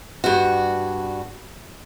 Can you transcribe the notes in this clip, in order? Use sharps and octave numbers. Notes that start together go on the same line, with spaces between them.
G2 F#4